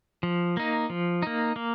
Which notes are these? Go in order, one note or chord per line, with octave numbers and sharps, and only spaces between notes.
F3
A#3 D#4
F3
A#3 D#4
A#3